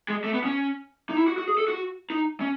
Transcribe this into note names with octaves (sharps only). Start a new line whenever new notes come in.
G#3
A3
B3
C#4
D#4
E4
F#4
F#4
G#4
A4
F#4
D#4
C#4